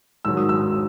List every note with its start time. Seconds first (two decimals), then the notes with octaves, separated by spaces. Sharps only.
0.25 G#2 D#3 F#3 E6
0.37 D#6
0.49 E6